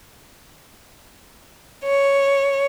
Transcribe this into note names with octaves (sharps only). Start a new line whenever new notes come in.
C#5